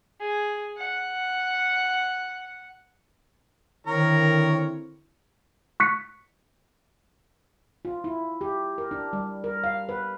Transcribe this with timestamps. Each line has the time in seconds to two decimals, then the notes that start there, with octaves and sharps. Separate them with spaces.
0.21 G#4
0.76 F#5
3.87 D3 D#3 C4 E4 A#4 C#5 A#5
5.80 C#6 F#6 B6 C#7
7.85 F4
8.04 E4
8.41 G4
8.78 A#4
8.91 D4
9.13 G3
9.44 A#4
9.64 F5
9.89 B4